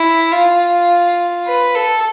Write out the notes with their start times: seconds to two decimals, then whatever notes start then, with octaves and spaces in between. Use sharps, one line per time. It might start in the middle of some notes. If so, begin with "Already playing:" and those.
Already playing: E4
0.32 F4
1.48 B4
1.76 A4